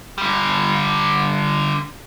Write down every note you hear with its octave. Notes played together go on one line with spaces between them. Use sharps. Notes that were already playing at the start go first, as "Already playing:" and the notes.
D3 G3